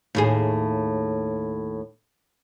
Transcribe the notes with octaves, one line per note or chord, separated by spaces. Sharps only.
D#2 A2 G#4